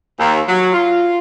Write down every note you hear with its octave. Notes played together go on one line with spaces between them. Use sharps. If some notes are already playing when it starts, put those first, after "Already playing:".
D#2
F#3
F4